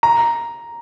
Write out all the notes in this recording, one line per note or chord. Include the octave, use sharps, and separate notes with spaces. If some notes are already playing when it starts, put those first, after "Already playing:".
A#5